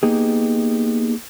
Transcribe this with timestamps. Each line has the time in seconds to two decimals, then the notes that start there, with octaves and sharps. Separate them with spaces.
0.03 A#3 B3 D#4 G4 G#4